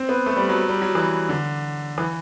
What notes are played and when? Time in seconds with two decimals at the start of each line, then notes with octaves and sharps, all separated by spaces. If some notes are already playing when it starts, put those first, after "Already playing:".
Already playing: C4
0.09 B3
0.26 A3
0.37 G3
0.49 F#3
0.69 G3
0.82 F#3
0.95 E3
1.29 D3
1.98 E3